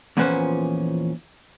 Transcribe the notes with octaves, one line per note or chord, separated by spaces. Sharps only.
E2 A#2 F3 C#4 B4 C5